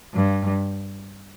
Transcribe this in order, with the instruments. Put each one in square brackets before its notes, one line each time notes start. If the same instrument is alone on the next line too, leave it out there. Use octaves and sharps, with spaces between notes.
[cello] G2